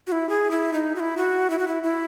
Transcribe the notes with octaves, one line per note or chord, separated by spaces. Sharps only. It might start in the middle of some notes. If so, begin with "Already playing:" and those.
F#4
E4
G#4
E4
D#4
F#4
E4
F#4
E4
F#4
E4
E4